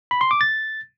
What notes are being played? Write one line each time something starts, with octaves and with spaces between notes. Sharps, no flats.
B5
C6
D6
A6